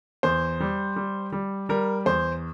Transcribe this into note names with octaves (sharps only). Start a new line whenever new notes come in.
E2 C5
G3
G3
G3
G3 A#4
E2 C5